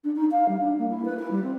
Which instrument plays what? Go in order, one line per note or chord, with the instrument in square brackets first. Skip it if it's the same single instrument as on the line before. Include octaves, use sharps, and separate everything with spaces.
[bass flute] D4
D#4
F5
G3
D4
A#3
E4
B4
E4
G3
C4